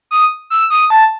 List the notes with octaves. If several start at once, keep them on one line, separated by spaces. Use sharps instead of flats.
D#6
E6
D#6
A5